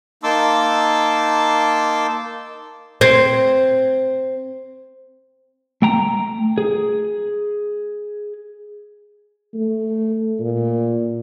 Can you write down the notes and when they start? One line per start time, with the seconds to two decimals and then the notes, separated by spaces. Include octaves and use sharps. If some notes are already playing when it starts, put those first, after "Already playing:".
0.23 A#3 D#4 A5 C6 D6 E6
3.01 C4
5.82 A3 G5 A#5
6.58 G#4
9.54 A3
10.40 A#2